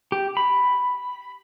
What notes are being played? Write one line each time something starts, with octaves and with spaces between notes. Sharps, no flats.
G4
B5